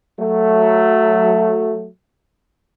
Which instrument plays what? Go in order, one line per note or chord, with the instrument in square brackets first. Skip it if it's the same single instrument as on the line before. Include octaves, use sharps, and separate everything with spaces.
[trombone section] F#3 A3